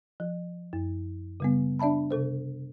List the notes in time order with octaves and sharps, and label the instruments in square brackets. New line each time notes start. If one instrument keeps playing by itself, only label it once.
[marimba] F3
F#2
C#3 G3 B3
D4 D5 E5 A5 B5
C3 A4 C5